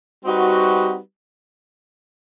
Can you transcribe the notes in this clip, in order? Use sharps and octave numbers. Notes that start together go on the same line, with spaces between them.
G3 C4 D#4 F#4 B4